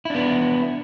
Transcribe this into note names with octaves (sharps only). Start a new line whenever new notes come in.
B3 D4 E4